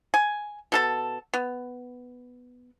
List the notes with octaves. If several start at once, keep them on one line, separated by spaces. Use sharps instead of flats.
G#5
B2 A4 A5
B3